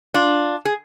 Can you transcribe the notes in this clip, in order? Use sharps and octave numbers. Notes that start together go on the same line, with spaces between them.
D4 F4
G#4